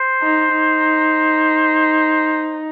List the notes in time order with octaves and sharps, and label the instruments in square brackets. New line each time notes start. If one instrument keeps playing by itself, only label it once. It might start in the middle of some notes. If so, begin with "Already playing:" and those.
Already playing: [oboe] C5
[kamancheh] D#4
D#4